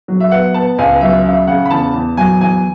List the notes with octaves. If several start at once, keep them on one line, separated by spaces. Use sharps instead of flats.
F#3
E5
B3 F#5
B3 A5
C#2 G#5
F#3 E5
C#3 E5
C#3 F#5
B5
E2 A5
E2
F#3 G#5
E2 G#5